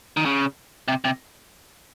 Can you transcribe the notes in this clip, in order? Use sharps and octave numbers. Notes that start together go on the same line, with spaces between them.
D#3
C#3
C3
C3